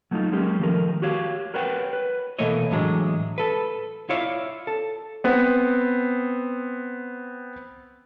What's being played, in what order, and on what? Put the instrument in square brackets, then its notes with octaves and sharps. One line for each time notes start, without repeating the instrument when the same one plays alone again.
[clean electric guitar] F#3 A3 B3 D#4 F4
F#3 G#3 A#3 C#4 G4
D#3 F3 A3 A#4
F#4 G4 C#5 F5
A#4 B4 C#5 F#5 G5
B4
[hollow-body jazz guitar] B2 E3 A3 A#3 C#5 D#5
A2 D3 E3 F#3 G#3
A4 B4
E4 F4 C#5 D5 E5 F5
A4
[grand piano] B3 C4